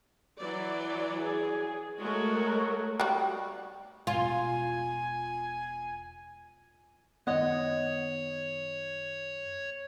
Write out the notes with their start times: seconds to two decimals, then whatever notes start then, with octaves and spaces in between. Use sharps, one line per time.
0.39 E3 F#3 D5
1.20 G#4
2.00 G#3 A3 F#4 A#4 C#5
3.00 G3 F#4
4.07 E1 F4 G#5
7.27 F#2 D#3 B3 C#5 D#5 F#5